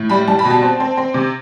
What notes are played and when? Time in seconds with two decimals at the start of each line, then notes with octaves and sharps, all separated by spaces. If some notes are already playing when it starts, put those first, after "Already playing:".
Already playing: A2
0.10 G3 B5
0.28 G3 A5
0.39 B5
0.45 B2
0.50 A5
0.62 C4
0.80 C4
0.97 C4
1.14 C3